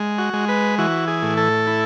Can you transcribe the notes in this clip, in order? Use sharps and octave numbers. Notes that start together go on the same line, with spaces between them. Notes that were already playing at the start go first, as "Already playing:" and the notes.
Already playing: G#3
F#4
G#3
B4
E3 F#4
G#4
A2
A4
E4